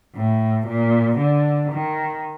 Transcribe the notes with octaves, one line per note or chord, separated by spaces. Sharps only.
A2
A#2
D3
D#3